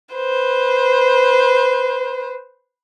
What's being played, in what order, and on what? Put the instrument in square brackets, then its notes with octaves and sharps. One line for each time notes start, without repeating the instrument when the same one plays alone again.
[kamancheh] B4 C5